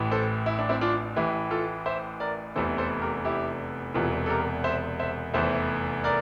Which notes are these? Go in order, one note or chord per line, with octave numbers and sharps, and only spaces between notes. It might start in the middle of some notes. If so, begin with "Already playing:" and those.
Already playing: A1 A2 E3
A4 C5
E4
D4
C4 E4
D4 F4
A1 A2 E3 E4 G4
F4 A4
C5 E5
A#4 D5
F1 E2 C3 E3 A4 C5
A4 C5
G4 A#4
E4 G4
E1 E2 C3 E3 F4 A4
A4
G4 A#4
C5 E5
C5 E5
F1 E2 E3 C5 E5
A#4 D5